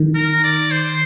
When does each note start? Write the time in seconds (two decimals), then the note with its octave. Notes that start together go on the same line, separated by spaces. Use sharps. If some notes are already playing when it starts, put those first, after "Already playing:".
Already playing: D#3
0.15 A#4
0.44 D5
0.71 C5